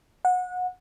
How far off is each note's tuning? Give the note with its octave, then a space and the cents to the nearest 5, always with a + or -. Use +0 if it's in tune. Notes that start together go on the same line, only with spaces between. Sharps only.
F#5 -25